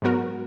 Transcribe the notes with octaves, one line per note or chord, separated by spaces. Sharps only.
G#2 F#3 B3 F#4 A#4